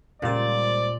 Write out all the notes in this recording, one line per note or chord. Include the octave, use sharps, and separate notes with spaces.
C#2 A#2 G3 C5 D5 A6